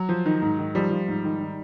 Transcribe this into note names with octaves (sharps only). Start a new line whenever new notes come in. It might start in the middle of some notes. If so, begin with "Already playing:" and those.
Already playing: F#3
F3
D#3
G#2
D#3
F3 G3
F3
G#2
D#3
D#3